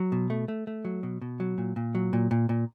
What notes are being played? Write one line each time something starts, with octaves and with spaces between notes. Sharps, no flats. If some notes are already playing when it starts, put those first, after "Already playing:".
Already playing: F#3
B2
A3
A3
A3
F#3
B2
B2
F#3
A#2
A#2
F#3
A#2
A#2
A#2